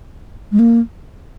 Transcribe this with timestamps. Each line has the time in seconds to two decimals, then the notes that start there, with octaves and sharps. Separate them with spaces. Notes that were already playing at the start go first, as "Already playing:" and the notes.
0.52 G#3
0.59 A#3